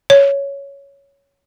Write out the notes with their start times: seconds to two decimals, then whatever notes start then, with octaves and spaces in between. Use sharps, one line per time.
0.10 C#5